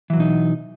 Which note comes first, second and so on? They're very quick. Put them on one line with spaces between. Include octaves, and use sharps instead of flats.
E3 F#3 B2 D#4